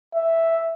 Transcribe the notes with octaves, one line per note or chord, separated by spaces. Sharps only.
E5